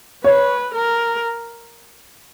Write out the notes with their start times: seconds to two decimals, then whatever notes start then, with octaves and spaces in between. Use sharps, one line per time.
0.24 B4 C#5
0.75 A#4